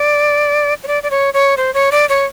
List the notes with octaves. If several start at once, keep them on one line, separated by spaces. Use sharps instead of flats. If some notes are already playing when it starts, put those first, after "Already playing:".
Already playing: D5
C#5
D5
D5
C#5
C#5
C5
C#5
D5
C#5